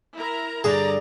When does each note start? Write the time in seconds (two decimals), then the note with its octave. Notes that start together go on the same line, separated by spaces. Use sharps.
0.15 E4 A#4 A#5
0.64 G2 D3 G3 G#4 D5 A#5